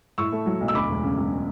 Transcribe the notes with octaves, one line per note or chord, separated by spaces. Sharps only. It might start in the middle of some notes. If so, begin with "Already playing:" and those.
A2 C#6 E6
A3
F#3
B1
E6
D2 B5 D6
E1
C#3
E1